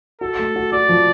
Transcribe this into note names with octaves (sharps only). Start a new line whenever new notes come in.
F#4 A4
A3
F#4
F#4 D5
F3